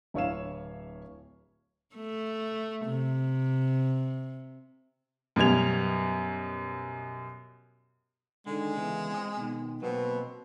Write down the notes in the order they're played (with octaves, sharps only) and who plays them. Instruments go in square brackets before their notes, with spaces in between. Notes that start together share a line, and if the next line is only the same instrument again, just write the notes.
[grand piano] D1 E4 C#5 F5 E7
[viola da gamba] A3
C3
[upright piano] F#2 B2 G3 G#6 F7
[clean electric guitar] D3 D#3 [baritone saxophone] G#3
[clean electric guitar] E2 C#3 E3
C4 D#5
B2 D#3
[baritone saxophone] B2 [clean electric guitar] F#3 A#3 C4